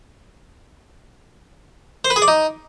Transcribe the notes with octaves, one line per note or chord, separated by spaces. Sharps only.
C5
B4
G#4
D5
D#4